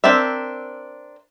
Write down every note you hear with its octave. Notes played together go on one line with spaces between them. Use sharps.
C4 D4 A#4 E5